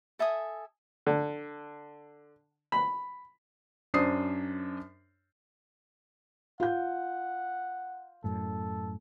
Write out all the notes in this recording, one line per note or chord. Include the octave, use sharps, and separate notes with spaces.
A4 E5 G#5 D#6
D3
B5
F#2 D4 C5 D#6 C7
F4 F#5 G6
F#2 A2 A4